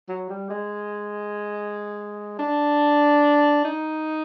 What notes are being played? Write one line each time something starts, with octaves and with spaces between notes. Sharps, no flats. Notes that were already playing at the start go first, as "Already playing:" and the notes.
F#3
G3
G#3
D4
D#4